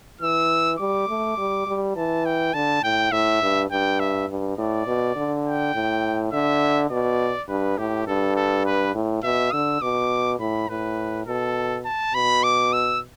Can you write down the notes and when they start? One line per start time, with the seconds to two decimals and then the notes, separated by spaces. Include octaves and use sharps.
0.21 E3 E6
0.79 G3 D6
1.09 A3
1.38 G3
1.67 G3
1.96 E3 A5
2.26 G5
2.54 D3 A5
2.83 A2 G5
3.12 A2 E5
3.42 G2
3.71 G2 G5
4.00 E5
4.29 G2
4.58 A2 D5
4.87 B2
5.16 D3
5.45 G5
5.75 A2
6.33 D3 E5
6.91 B2 D5
7.49 G2 B4
7.78 A2 G4
8.07 G2 A4
8.37 A4
8.66 B4
8.95 A2
9.24 B2 E5
9.53 D3 E6
9.82 B2 D6
10.40 A2 B5
10.69 A2 B4
11.27 B2 A4
11.85 A5
12.14 B2 B5
12.44 D6
12.73 E6